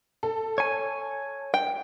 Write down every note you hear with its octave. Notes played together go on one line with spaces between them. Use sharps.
A4
C#5 G#5
G5